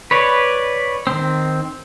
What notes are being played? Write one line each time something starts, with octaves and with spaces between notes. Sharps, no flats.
B4 C#5 D5
D#3 C4